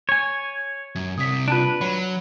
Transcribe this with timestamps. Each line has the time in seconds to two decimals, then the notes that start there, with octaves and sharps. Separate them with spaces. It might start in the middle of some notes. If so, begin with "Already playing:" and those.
0.09 C#5 G#5
0.95 F#2 G#6
1.18 C2 C3 D#6 B6
1.48 D4 F4 B4 A5 D7
1.81 F#3 C#5 B5